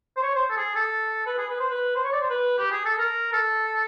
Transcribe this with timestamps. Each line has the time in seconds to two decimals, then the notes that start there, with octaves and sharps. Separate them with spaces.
0.17 C5
0.23 C#5
0.35 C5
0.50 A4
0.57 G#4
0.75 A4
1.26 B4
1.38 G#4
1.49 B4
1.60 C5
1.70 B4
1.95 C5
2.04 C#5
2.12 D5
2.21 C5
2.30 B4
2.58 G4
2.72 G#4
2.85 A4
2.99 A#4
3.33 A4